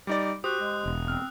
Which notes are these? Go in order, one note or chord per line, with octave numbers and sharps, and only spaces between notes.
G3 D#4 D5 D6
F#4 G4 C5 D#6 F#6
G#3
E1
C4 F6